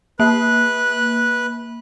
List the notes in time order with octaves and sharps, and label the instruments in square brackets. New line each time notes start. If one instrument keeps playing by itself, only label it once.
[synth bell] A#3 [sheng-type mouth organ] B4 F#6